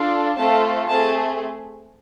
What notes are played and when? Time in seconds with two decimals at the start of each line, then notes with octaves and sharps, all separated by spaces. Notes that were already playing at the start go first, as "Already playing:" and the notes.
Already playing: D4 F4 A4
0.36 A3 C4 F4 A4 A5
0.89 A3 C4 G#4 A5